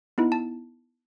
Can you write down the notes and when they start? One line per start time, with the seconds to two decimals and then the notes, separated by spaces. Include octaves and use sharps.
0.18 B3 D#4 E4
0.32 A5